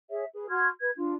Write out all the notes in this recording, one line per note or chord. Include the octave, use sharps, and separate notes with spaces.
G#4 C#5 E5
G#4 B4
F#4 C6 F6 G#6
B4 G#6
D4 F4